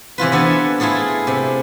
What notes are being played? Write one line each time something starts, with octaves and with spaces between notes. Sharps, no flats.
C3 E3 F4 B4
B3 D4 A4 G#5
A3 E4 F4 G#4 A4
C3